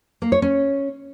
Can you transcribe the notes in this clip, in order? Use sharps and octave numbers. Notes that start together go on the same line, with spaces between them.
A#3
C#5
C#4